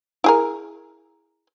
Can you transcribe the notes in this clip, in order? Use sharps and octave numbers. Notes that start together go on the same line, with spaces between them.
E4 G#4 A#4